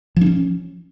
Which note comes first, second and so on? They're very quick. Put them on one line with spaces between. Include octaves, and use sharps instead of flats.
F3 D4 C#4